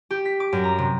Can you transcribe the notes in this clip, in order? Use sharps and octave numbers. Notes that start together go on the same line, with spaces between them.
G4
B6
D6
F#2
A#5
C3